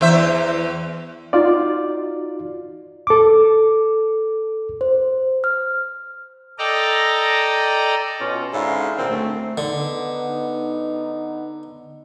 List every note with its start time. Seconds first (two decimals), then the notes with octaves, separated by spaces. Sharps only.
0.01 E2 C5 E5
1.33 D#4 F4 F#4 D5
3.07 A4 D6
4.81 C5
5.44 F6
6.58 A4 D5 D#5 G5 A#5
8.20 B2 C#4 F4
8.53 G#2 D3 C#4 E4 F5
8.98 A#2 D3 C4
9.10 D2 A3
9.58 D3 B3 D#4